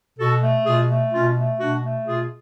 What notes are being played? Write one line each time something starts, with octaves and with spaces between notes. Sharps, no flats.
B2 F#4 A4
A3
B2 F4 G#4
A3
B2 C#4 F4
A3
B2 D4 F#4
A3
B2 F4 G#4